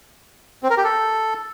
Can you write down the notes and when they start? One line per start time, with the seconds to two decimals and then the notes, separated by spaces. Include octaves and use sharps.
0.63 C4
0.70 A#4
0.77 G4
0.84 A4